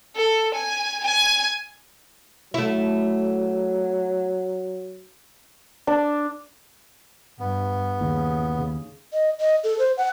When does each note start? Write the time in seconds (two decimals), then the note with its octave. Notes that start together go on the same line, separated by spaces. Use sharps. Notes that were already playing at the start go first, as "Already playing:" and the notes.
0.16 A4
0.55 G#5
1.04 G#5
2.54 F#3 A3 E4
5.87 D4
7.39 G2 B3
8.01 D#2 C#3
9.12 D#5
9.40 D#5
9.64 A4
9.79 C5
9.97 F#5